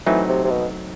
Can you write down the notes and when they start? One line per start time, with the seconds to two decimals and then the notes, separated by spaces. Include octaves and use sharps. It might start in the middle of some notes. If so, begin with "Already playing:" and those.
0.06 E3 F#3 A3 C4 D#4
0.29 C3
0.45 C3
0.50 B2